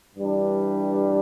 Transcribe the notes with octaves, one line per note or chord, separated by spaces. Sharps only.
G2 E3 G3 D4